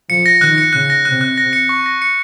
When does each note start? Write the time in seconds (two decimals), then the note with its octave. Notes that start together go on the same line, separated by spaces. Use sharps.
0.09 F3 C#7
0.26 A#6
0.41 D#3 F#6
0.58 C#7
0.73 C#3 F#6
0.90 A#6
1.05 C3 F#6
1.21 F#6
1.38 A#6
1.53 C#7
1.69 C#6
1.86 A#6
2.02 C#7